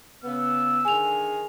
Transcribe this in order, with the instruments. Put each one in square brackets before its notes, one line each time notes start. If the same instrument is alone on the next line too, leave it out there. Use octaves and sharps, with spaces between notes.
[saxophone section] C#3 B3 [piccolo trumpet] E6
[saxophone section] D3 D#3 G#4 [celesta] G#5 F7